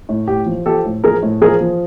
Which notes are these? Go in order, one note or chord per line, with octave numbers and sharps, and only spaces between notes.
A2
A2 G4
F3
F3 G4 A4
A2
F3 G#4 A#4
A2
F3 G#4 A#4
F3